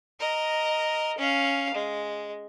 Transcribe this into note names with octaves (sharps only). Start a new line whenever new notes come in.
A#4 D#5
C#4 F5
G#3